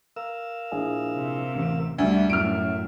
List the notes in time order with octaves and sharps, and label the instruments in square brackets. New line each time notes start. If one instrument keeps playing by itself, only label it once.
[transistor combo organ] A#4 F5 E6
[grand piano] A#1 E4 G#4
[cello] C3
[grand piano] A1
[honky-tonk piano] D2 [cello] G3 A3 [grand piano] D4 [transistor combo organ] E5
[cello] F#2 [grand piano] A2 [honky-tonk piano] F6 D7